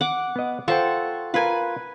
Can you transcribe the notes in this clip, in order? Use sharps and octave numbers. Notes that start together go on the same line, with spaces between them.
F#5 D6
B3 D#5
F4 A4 C5 F#5 G5 C#6
F4 A#4 B4 G#5